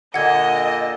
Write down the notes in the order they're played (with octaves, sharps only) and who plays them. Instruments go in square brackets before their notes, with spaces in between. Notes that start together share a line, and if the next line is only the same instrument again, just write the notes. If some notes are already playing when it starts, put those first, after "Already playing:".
[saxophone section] A#2 D3 [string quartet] D#5 [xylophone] F#5 G#6